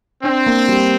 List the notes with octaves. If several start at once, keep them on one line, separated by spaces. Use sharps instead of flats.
C4 D4
A#3
G3